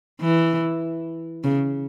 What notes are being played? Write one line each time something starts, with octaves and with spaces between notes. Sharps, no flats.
E3
C#3